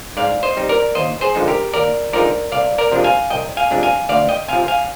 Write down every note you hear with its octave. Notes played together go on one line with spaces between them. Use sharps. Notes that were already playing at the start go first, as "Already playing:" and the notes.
G#2 D5 F5
C5 D#5
G3 C4 D#4
A#4 D5
D#2 C5 D#5
G#4 C5
D3 F3 G#3 D#4
G4 A#4
D#2 A#4 D5
D3 F3 G#3 D#4 A#4 D5
C2 D5 F5
A#4 D5
C3 F3 G#3 D4
F5 G#5
C2 D#5 G5
F5 G#5
C3 F3 G#3 D4
F5 G#5
D2 D5 F5
D#5 G5
C3 F3 F5 G#5
F5 G#5